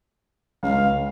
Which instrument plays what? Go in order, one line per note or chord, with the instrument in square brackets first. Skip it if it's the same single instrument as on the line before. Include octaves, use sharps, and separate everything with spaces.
[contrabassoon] C#2 [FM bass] G#3 [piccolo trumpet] F5